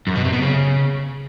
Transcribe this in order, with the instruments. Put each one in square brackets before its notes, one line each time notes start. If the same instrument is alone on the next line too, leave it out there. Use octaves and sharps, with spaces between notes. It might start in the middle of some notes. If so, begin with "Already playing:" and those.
[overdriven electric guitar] F#2
B2
C3
B2
C#3